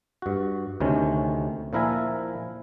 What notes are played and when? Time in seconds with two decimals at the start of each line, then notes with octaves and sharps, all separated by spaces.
0.22 G2 F#4
0.80 D2 C3 D#3 C#4
1.73 A#2 F3 E4 A#4 E5 G#5